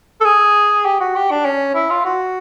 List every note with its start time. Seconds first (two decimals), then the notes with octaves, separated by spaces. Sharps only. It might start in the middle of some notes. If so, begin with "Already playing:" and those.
0.21 A4
0.25 G#4
0.85 G4
1.01 F#4
1.16 G4
1.31 D4
1.45 C#4
1.75 E4
1.91 F4
2.05 F#4